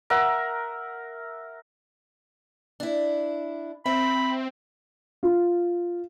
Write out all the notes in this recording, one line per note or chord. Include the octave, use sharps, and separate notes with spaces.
A#4 E5 F#5
D4 E4
C4 E5 B5
F4